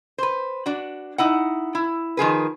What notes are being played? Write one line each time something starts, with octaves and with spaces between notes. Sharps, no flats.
B4 C5
D4 F#4
D#4 E4 F#5
E4
D#3 F3 G#4 B4